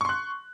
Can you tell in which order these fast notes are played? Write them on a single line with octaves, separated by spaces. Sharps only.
C#6 C6 F#6